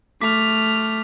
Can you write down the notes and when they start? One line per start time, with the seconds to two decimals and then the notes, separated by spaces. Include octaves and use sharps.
0.21 A3 D6 F6 B6